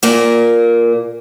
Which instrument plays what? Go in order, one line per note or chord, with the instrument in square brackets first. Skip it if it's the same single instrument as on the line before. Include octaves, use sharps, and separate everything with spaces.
[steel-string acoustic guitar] A#2 A#3